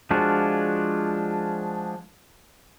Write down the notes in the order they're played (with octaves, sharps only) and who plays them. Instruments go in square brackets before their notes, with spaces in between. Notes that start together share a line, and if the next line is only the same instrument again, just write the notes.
[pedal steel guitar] F3 G#3 D4 F4 F#4